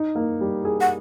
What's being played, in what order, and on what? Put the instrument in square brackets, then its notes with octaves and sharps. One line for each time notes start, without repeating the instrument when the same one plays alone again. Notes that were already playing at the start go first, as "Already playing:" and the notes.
Already playing: [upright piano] D#4
A#3
G3
G#4
[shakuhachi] F#5